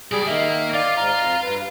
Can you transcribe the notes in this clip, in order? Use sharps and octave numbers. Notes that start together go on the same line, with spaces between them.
C#2 G3 G#4 D5
D#3 A#3 E5
F4 D5 F5
G#2 F5 A#5
F2
G2 B4